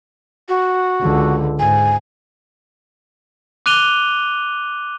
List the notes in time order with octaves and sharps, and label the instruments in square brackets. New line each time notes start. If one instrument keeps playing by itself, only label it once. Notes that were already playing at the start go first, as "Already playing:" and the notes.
[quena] F#4
[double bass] C#2 D3
[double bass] G#2 [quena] G#5
[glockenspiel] D6 F#6 D#7 F7 G7